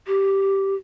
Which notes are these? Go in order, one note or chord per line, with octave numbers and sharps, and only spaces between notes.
G4